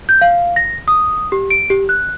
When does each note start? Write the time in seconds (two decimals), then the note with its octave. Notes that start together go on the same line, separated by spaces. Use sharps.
0.09 G6
0.21 F5
0.56 A#6
0.88 D#6
1.32 G4
1.50 D7
1.70 G4
1.89 F#6